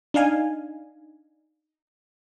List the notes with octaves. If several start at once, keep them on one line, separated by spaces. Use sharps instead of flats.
D4 D#4 F5 G#5